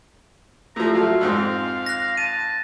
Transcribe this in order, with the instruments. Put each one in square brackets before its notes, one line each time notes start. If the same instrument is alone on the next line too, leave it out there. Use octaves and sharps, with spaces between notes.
[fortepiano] A2 F3 [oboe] A#5
[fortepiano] F3 F#3 A3 [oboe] F5
[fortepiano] F2 G#2 C4
[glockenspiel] F#6 A#6
[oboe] A5 [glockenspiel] D#7